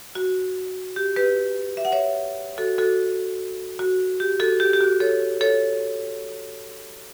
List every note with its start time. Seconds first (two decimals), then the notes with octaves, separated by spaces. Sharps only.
0.15 F#4
0.96 G4
1.16 G4 B4
1.77 E5
1.85 F#5
1.92 C#5 E5
2.58 F#4 A4
2.78 F#4 A4
3.79 F#4
4.20 G4
4.40 F#4 A4
4.60 G4
4.73 G4
4.81 F#4
5.00 A4 C#5
5.41 A4 C#5